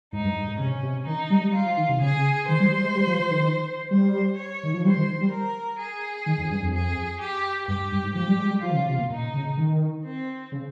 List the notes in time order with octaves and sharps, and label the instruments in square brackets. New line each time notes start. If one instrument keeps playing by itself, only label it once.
[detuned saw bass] G#2 [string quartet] D#4
[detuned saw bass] G2
G2
G#2
[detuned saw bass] C3 [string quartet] C#4
[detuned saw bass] C3
[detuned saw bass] D#3 [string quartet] D#4
[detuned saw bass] G3
G3
[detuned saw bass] G3 [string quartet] F4
[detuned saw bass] F3
D#3
C3
[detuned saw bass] C#3 [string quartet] G#4
[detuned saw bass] D#3 [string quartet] C5
[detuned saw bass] G3
G3
G#3
G3
F3
F3
D#3
[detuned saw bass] G3 [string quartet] C5
[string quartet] C#5
[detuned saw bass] D#3
F3
[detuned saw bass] G3 [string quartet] C5
[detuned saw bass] D#3
G3
[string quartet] A#4
G#4
[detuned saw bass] D#3
F2
G2
F2
[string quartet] G#4
G4
[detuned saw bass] G2 [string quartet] G4
[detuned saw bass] G2
G#2
[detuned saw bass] F3 [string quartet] G4
[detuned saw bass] G3
G#3
G3
[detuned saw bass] F3 [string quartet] F4
[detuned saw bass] D#3
C#3
C3
A#2
[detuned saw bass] A#2 [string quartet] D#4
[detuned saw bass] C#3
D#3
[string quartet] C4
[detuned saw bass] C#3